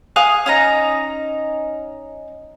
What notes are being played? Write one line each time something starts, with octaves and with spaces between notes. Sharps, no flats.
F5 G#5 D#6 F#6
C#4 D#4 A#5